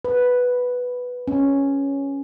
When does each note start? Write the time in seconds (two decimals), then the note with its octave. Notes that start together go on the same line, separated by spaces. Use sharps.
0.05 B4
1.28 C#4